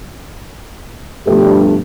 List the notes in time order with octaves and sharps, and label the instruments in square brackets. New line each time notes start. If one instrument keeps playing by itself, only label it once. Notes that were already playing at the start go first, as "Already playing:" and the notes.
[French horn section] G2 [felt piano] B2 F3 A3 [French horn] G4